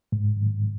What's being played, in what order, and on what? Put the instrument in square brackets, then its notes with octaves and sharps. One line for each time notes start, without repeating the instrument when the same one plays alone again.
[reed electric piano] G#2